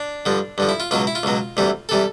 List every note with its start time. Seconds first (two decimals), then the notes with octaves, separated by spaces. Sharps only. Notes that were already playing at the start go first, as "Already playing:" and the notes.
Already playing: D4
0.26 G2 D3 F3
0.58 G2 D3 F3
0.69 E4
0.80 F4
0.91 C#2 B2 F#3 F4
1.07 E4
1.15 F4
1.23 C#2 B2 F#3
1.57 D2 C3 E3 G3
1.89 C3 E3 G3 A4